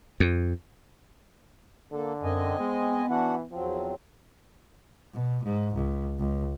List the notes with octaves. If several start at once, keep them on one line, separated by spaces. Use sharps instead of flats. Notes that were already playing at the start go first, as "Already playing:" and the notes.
F2
D3 A#3 A4
F#2 C4 D#5 G#5
G#3 B3
E3 D4 F#4 F#5
E2 F3 F#3 C4
B2
G#2
C#2
C#2